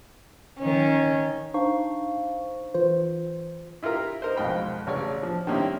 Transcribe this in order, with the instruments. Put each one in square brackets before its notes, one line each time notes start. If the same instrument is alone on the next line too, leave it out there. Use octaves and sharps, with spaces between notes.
[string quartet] D#3 C#4
[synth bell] D4 D#4 C5 F5 C#6
E3 F4 C5
[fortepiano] E4 F4 G4 A#4 A#5
D#4 A#4 C5
B1 F2 G#2 D#5 G5 B5
A1 C#3 C#5 D5
F3
D#3 G3 A#3 C4 C#4 E4